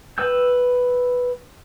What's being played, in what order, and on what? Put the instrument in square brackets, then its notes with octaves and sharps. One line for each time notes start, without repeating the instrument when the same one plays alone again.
[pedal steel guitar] B4 G5 E6 G6